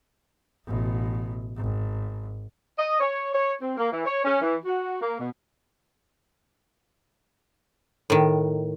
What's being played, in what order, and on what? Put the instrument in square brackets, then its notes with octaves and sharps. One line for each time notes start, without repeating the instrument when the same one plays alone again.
[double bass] A1 B2
G#1
[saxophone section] D#5
C#5
C#5
C4
A#3
E3
C#5
C#4
E3
F#4
A#3
B2
[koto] A2 D#3